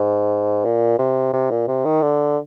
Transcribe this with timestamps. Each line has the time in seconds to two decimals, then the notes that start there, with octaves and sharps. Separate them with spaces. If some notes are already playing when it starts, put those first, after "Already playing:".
Already playing: G#2
0.65 A#2
0.99 C3
1.34 C3
1.51 A#2
1.68 C3
1.85 D#3
2.02 D3